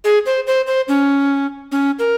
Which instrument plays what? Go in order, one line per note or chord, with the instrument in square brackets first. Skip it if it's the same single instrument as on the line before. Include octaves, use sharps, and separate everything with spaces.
[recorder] G#4
C5
C5
C5
C#4
C#4
A#4